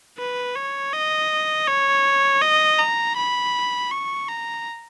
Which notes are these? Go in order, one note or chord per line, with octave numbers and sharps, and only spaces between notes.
B4
C#5
D#5
C#5
D#5
A#5
B5
C#6
A#5